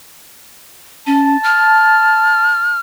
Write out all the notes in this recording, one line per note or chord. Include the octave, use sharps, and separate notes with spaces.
C#4 A5
F6